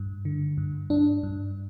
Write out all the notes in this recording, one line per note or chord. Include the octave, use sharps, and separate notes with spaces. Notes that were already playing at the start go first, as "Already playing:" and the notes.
Already playing: G2
D3
G2
G2 D4
G2